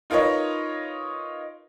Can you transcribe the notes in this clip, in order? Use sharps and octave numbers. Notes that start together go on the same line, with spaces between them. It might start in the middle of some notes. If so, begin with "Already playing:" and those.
D#4 F4 A#4 B4 C#5 D#5